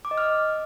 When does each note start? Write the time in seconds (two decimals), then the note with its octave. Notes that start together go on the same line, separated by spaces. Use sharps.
0.05 D6
0.11 D#5
0.18 F6